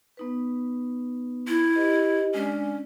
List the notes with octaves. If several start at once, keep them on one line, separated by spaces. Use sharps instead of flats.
B3 D#4 B4
E4
G4 B4 D#5
G#3 C#4 D4 D5